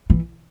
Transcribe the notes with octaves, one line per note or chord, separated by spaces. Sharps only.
E3